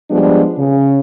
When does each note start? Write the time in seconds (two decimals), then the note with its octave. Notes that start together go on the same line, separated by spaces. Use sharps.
0.10 F3 G3 G#3 B3 D4
0.57 C#3